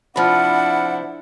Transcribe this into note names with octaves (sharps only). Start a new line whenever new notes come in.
C3 F3 D4 E4 F#5 B5 F6